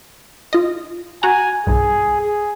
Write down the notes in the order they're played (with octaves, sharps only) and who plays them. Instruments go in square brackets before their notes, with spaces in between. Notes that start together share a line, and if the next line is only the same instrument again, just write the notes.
[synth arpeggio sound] F4 D#5
[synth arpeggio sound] F#4 F#5 A#5 [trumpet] G#5
[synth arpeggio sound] B1 G2 [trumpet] G#4
[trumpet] G#4